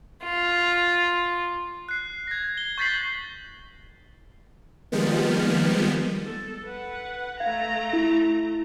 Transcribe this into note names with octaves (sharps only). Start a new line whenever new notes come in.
F4
F#6 C7
G#6 A#6
G7
C#6 G6 A6 B6 C7 F#7
D#3 F3 G3 G#3 A#3 B3
A4
B4 F#5
A3 F5 A#5 G#6
E4